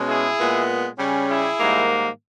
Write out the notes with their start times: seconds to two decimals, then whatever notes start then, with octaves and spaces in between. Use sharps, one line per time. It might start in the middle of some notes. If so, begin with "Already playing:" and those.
Already playing: B2 G#3 C#4
0.08 E4 G#4
0.39 A#2 G#3 B3
0.99 C#3 G3 C#4
1.29 E4 G#4
1.60 G#2 D#3 G3 A#3